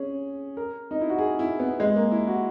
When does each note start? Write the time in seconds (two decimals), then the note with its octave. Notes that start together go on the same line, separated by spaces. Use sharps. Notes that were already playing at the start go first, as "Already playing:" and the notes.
Already playing: C#4 G#4
0.57 A#4
0.91 D#4
1.01 E4
1.09 F#4
1.18 G#4
1.39 E4
1.60 B3
1.80 G#3
1.96 A#3
2.11 E4
2.27 F#4